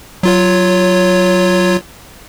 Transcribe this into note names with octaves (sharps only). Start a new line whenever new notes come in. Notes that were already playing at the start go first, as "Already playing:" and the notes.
F#3 F4 C#5